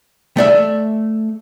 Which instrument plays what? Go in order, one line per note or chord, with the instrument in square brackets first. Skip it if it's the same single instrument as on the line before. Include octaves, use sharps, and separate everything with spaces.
[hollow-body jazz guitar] A3 D5 E5